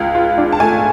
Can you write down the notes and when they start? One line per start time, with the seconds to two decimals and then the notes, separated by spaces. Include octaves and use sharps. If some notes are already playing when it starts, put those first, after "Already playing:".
Already playing: C#2 F5
0.15 F4
0.38 D4
0.53 A5
0.60 A3 G#5